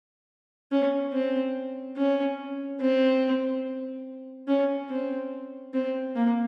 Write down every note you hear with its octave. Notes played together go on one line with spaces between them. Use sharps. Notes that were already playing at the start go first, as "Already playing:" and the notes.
C#4
C4
C#4
C4
C#4
C4
C4
A#3